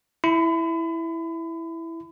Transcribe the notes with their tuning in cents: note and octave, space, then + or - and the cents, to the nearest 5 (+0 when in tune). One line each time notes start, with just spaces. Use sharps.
E4 +0 B5 +35